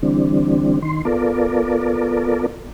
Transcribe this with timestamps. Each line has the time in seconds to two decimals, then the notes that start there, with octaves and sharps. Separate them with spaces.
0.03 D3 E3 G3 C4 D4
0.82 D#3 C6
1.05 B3 F4 A4 A#4 D5